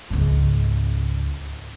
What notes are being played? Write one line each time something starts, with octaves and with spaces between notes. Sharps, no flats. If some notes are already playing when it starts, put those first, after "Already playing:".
C#2 G#2